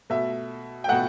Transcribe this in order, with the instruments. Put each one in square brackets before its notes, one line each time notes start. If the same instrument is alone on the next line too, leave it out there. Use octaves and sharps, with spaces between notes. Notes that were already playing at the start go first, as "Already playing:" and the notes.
[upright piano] B2 A3 E5
G5
B2 A3 F#5